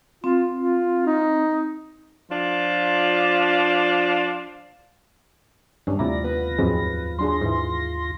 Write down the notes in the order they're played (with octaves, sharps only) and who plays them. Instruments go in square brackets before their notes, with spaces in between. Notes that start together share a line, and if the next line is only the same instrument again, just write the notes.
[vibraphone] C4 [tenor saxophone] F4
[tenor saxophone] F4
D#4
[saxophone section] F3 D4 F4
[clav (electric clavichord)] G2 C#4 [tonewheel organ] E3 [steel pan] G3 D4
[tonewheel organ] D#2 F4 A#6 [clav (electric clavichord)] C3 E4 A#5 [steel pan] A3 [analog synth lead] D5
[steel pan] B3 [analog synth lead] B4
[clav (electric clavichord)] F2 G#2 G#3 [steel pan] F#3 C4
[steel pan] F#3 D4 G#4 [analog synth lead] C6
[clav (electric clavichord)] G#2 E3 [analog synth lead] C6